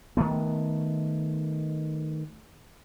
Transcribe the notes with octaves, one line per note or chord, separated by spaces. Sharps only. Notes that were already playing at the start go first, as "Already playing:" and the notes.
D#3 A3 B3